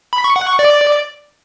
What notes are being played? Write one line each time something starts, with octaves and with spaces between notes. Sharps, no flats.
B5
C#6
F#5
C#6
D5